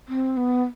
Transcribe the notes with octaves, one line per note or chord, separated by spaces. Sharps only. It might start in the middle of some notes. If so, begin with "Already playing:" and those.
C4
B3